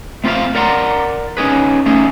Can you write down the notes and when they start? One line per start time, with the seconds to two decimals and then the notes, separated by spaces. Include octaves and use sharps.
0.24 A3 C4 F4 C5 E5 F5
0.55 A#4 D5 F#5 A#5 C6
1.37 C#4 D#4 G#4 B4
1.86 A3 C#4 D#4 G#4